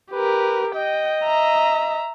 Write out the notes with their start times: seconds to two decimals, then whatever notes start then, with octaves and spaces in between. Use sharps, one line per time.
0.12 G4 A#4 B4
0.75 D#5 G5
1.24 E5 A#5